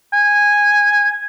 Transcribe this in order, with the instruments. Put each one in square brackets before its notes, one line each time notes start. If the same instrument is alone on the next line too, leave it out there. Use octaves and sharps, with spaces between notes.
[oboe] G#5